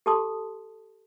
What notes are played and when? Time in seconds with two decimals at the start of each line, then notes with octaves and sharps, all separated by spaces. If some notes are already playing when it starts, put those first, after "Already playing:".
0.06 G4 A4 A5 C6 D#6